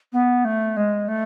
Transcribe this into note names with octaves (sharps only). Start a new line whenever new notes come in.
B3
A3
G#3
A3